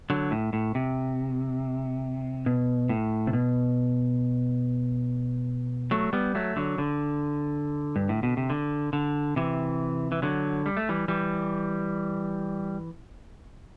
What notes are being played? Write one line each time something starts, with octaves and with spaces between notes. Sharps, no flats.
D3 F#3
A2
A2
C3
B2
A2
C3
B2
F#3 A3
G3 B3
F#3 A3
D3 F#3
D3
G2
A2
B2
C3
D3
D3
C3 E3
E3
D3 F#3
G3
A3
E3 G3
E3 G3